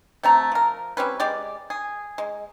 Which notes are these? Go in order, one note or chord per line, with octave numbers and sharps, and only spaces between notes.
C3 A3 A#5
F3 A#4
G3 C4 C#4 B4
G#3 G4 D5
G#4
G#3